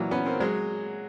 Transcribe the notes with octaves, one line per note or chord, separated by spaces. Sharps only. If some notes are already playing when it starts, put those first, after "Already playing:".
Already playing: A#2 E3 F#3
B3 C#4
A#3 C4
F#3 G#3